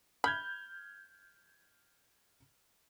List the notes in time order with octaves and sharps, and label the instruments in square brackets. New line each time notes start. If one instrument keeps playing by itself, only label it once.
[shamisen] B5 [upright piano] F6 G6 G#6